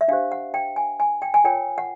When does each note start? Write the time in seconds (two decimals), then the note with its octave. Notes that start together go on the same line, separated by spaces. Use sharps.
0.01 E5
0.08 D4 G4 C5 F5
0.32 F#5
0.54 G5
0.76 G#5
1.00 G#5
1.22 G5
1.34 G#5
1.44 F4 A#4 C#5 G5
1.78 F#5